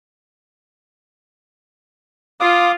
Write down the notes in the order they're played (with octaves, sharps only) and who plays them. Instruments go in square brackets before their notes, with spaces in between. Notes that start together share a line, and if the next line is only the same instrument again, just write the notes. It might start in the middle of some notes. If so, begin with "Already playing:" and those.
[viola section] F4 [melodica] F5 D6 D#6